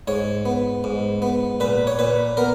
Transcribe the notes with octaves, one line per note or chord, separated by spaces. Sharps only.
G#2 C#5
B3
G#2
B3
A#2 B4
C#5
A#2 B4
B3 A#4